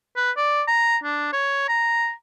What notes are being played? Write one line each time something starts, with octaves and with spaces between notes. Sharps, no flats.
B4
D5
A#5
D4
C#5
A#5